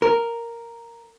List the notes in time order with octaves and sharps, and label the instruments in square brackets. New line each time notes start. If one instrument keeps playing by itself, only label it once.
[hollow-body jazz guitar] A#4